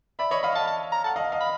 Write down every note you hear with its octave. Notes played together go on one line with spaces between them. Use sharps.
D5 E5 B5
C#5 D#5 B5
D#5 F5 B5
D#5 F5 A5
A5
A#5
F#5 A5
D#5 F5
D#5 F5
B5